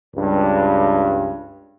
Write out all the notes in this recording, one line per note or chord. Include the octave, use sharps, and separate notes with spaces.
C#2 G2